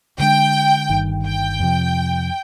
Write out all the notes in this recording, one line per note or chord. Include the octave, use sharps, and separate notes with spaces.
D2 D3 G#3 D4 G5
G1 G2 D#3
G5
F2 C3 F3